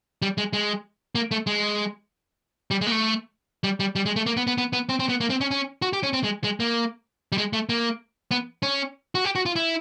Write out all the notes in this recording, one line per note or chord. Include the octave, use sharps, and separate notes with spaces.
G3
G#3
G#3
A#3
A3
G#3
G3
G#3
A#3
A3
G3
G3
G3
G#3
A3
A#3
B3
B3
B3
B3
C4
C4
B3
A#3
C4
C#4
C#4
F#4
G4
C#4
C4
G#3
G#3
A#3
G3
G#3
A3
A#3
B3
C#4
F#4
G4
F#4
F4
E4